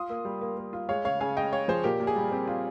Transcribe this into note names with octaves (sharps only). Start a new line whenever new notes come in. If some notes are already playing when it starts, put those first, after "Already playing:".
Already playing: F4 C6 D#6
A#3
G3
A#3
A#3
F4
G#3 C#5 F5
C#3 C#5 F5
C#3 F5 G#5
G#3 D#5 G5
G#3 C#5 F5
F3 G#4 C5
A#2 G4 A#4
A#2
G#4
G3
C4 G4
F4